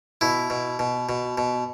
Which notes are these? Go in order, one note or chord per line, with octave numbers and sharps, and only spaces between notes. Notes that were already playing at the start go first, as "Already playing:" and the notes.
B2 E4
B2
B2
B2
B2